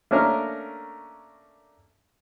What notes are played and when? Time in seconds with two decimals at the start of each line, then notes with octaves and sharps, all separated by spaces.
0.11 A3 A#3 C#4 D4 A#4